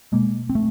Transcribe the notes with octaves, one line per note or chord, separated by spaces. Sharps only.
B2 G#3 A#3
C4
A3